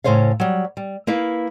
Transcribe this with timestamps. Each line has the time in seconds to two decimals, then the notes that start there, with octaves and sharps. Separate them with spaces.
0.04 A2 C#3 C5 C#5 F5
0.40 F#3 G3
0.77 G3
1.07 A#3 E4 B4 F5